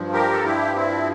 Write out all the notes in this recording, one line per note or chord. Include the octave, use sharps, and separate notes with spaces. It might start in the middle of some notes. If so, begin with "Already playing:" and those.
Already playing: G2 F3
G4 A#4
A4
E4 G4
C4 E4